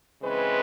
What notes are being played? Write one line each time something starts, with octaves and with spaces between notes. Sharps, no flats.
C#3 E3 G#3 C4 B4